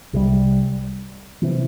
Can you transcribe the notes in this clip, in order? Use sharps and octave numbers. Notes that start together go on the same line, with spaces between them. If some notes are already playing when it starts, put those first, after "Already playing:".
C2 C3 G3
C3 E3